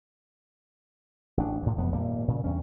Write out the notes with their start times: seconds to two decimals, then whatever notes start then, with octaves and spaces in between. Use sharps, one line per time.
1.37 A1 D4
1.62 D2 A2
1.77 E1 F2 B3
1.92 G#1 A#2 G3
2.28 A#2 C#3
2.44 E2 G2 C#4